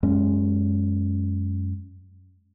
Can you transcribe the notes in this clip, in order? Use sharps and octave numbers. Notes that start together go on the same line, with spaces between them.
F#2 G#3 C#4